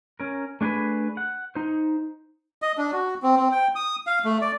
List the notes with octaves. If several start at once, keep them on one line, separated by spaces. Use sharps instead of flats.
C#4 A#4
A3 D4 G#4 A#4 B4
F#5
D#4 C5
D#5
D4
F#4
C4
C4
G5
D#6
F5
A3
D5